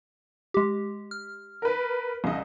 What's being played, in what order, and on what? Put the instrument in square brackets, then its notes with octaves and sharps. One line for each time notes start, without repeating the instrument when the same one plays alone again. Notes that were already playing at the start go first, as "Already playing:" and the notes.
[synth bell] G#3 G4
F6
[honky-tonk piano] A#4 B4
C2 C#3 D#5